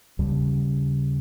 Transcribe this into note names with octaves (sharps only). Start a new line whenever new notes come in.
D#2 C#3 G3